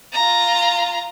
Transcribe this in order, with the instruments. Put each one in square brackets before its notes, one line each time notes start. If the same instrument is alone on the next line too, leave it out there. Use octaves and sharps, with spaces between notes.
[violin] F4 A#5